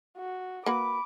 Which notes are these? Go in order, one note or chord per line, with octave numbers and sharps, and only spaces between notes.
F#4
A#3 F#4 B4 B5 D6